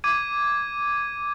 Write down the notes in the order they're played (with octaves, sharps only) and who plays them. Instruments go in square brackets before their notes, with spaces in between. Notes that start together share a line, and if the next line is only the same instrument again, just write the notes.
[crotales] D6 G#6 D#7